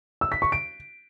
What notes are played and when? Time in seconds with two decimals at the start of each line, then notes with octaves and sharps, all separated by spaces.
0.21 E6
0.32 B6
0.42 C#6
0.52 D7